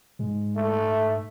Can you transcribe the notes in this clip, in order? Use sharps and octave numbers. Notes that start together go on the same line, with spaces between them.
G#2 G#3
A3
E5